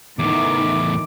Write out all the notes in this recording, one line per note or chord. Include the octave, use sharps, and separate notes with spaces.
E2 A2 D#3 E3 D6